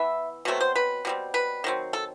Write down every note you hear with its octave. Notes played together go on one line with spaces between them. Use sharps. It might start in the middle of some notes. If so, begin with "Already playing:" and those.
Already playing: E3 B3 E4 E5
B2 F#3 A3 C4
C5
B4
B2 G3 C4
B4
D#3 F#3 C4
A4